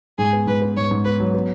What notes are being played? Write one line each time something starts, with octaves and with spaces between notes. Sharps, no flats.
G#2 G#4
B3
G#2 B4
B3
G#2 C#5
G#2
B3 B4
F#3
B3